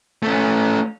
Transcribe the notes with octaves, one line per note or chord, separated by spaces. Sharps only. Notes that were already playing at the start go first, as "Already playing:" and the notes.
A3 C#4